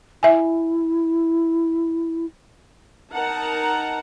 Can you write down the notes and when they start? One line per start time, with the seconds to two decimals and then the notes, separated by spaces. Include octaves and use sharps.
0.23 E4 E5 G#5
3.12 D#4 A#4 F#5 A5 A#5